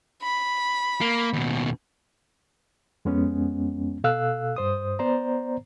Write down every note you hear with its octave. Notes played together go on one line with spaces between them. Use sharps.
B5
A#3
D#2 B2
F2 G#3 B3 C#4
B2 A4 F5 E6 F#6
G2 C5 D#6
B3 C5 D5 A#5